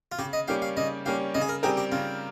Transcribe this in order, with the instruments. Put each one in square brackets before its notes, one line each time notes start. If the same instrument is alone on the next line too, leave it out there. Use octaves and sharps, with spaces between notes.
[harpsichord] F4
[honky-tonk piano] C#3 [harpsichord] G4
[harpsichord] D#5
[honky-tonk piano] G3 A#3 C#4 G4 [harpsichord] F5
[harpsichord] F5
[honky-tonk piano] C#3 [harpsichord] D#5
[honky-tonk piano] G3 A#3 C#4 G4 [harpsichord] F5
[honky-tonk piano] C#3 [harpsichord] D#5
[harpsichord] G#4
A#4
[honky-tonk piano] G3 C4 G4 A#4 [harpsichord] G#4
[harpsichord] G4
[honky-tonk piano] C#3 [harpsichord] F4